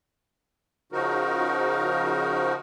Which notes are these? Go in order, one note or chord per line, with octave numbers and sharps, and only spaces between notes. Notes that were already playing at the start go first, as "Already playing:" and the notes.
C#3 F3 D#4 F#4 A#4